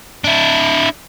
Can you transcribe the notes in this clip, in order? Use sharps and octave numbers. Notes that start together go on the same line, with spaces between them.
D4 E4